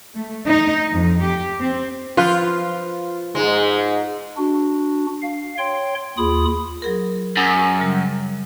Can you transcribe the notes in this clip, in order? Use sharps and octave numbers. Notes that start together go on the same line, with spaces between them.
A3
D#4
F2
G4
C4
F3 F4 B4
G#2 G#3
D4 F#4
F5
C#5 G5 C6
D#2 F4 G#4 B5 D#6
F#3 G#4 A#4
F#2
C#3 G3